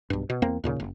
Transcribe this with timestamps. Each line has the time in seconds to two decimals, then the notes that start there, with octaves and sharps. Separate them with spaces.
0.10 B1 G2
0.30 B2
0.42 E2 A#3 C4
0.64 D#2 A#2 C#3
0.80 F#1